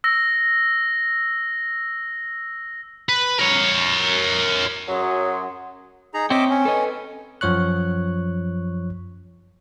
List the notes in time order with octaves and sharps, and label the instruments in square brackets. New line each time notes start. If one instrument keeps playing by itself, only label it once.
[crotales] E6 A#6
[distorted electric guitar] B4
A#4 C#5
[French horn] F#2 [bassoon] F#3 [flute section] G#4 F#5 C6
[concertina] D#4 G#4 A#5
[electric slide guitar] C4 C#5 G5 [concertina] D#5 E5 D6
[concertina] C#4
[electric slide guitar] A4 B4 D#5
[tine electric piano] F#2 F3 C#5 C#6 F#6